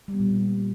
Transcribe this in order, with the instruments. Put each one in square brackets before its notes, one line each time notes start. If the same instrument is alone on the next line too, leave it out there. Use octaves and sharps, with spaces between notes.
[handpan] G3
B3
A#2